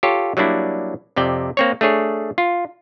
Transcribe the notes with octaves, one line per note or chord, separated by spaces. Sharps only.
F4 G4 A4 C#5
F#3 G3 A#3 D4 E4
F2 C3 D5 G5
A#3 C4 C#5
A3 D4 G#4 C#5
F4